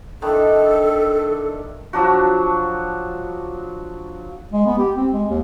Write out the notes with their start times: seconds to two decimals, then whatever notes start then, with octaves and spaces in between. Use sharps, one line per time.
0.22 D#3 D4 E4 A4
1.93 F3 F#3 D4 F#4
4.52 G#3
4.66 B3
4.78 G4
4.97 C4
5.13 G#3
5.29 D#2